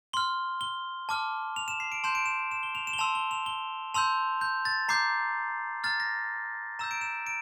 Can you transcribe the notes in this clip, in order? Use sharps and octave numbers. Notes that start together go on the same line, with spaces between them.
C6 F6 G7
G7
A5 D6 F6
F7
E7
C7
D7
A5 C6 G6 E7
D7
E7
E7
G7
F7
E7
G7
A5 C6 E6 F7
G7
F7
G7
A5 C6 E6 G6 F7
G6
A6
A#5 D6 G6 C7
A#5 F6 A6
A#6
A#5 E6 G6 E7
D7
E7
D7